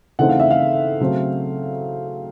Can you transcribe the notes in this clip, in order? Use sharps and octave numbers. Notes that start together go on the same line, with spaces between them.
C#3 E3 A3 C4 D#4 F#5
F5
E5
F5
C#3 F#3 A3 C4